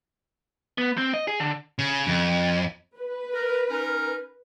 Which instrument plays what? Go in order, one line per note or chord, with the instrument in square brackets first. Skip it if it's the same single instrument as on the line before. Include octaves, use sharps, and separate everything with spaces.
[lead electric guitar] B3
C4
D#5
G#4
D3
C#3
F2
[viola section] B4
[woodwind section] A#4
C#4 D#4 A#4